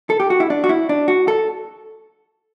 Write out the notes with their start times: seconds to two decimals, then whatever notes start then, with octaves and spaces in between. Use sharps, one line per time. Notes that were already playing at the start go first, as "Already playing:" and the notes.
0.10 A4
0.20 G4
0.30 F#4
0.40 E4
0.50 D4
0.64 F#4
0.69 E4
0.89 D4
1.08 F#4
1.28 A4